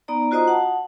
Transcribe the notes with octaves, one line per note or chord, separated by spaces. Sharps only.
B3 D#4 D5 A#5
F4 F#4 C5 D#5 A#5 D#6
F#5 A5